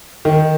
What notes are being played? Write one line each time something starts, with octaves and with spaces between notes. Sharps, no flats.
D#3